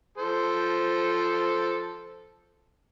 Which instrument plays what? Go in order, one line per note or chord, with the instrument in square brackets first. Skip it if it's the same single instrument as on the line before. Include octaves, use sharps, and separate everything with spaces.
[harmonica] F3 A4 C5